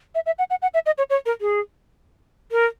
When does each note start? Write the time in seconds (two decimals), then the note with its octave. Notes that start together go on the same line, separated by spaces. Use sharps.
0.15 E5
0.26 E5
0.39 F#5
0.50 F#5
0.62 F#5
0.74 E5
0.86 D#5
0.98 C#5
1.10 C#5
1.26 A#4
1.41 G#4
2.52 A#4